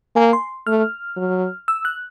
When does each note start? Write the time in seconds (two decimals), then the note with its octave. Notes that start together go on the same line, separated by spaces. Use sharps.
0.16 A#3 G#5
0.33 C6
0.67 A3 F6
1.17 F#3
1.68 E6
1.85 F#6